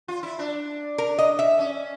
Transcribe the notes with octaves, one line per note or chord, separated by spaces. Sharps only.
F4
E4
D4
A#4
D#5
E5
C#4